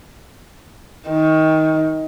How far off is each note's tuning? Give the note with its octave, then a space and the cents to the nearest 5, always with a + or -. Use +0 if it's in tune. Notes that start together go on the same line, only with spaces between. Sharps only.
D#3 +20